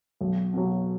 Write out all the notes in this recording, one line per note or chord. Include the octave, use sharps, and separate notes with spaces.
B1
B2 F#3